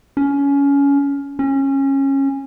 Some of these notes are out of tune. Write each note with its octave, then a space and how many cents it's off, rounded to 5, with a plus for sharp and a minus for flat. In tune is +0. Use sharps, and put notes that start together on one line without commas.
C#4 +20
C#4 -20